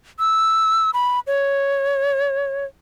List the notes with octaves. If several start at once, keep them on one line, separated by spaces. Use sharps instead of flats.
E6
B5
C#5